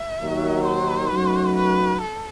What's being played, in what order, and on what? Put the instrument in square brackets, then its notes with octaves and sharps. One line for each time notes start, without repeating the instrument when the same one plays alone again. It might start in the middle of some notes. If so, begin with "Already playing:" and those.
Already playing: [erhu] E5
[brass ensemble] D#2 D#3 F#3
[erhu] C5
[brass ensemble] F#2 F#3 A3 D#4 F#4
[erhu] B4
A4